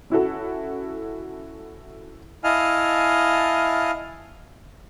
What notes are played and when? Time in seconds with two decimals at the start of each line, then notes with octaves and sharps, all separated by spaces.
0.10 C#4 E4 F#4 A4
2.44 E4 D#5 F5 G#5 A5 F6